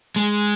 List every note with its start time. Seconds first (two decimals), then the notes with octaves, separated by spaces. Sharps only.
0.16 G#3